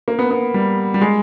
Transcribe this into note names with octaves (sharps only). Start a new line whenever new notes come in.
A#3
B3
B3
G3
G3
G#3